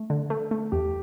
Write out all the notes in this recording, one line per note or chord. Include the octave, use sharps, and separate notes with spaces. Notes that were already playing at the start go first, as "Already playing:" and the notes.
Already playing: A3
D3
A3
A3
E2 G4